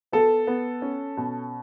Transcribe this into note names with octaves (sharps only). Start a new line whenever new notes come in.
B3 A4
B3
C#4
B2